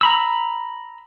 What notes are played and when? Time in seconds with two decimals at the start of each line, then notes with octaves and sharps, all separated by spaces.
0.01 A#5 B5 E6